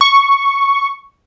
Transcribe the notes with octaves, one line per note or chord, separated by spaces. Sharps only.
C#6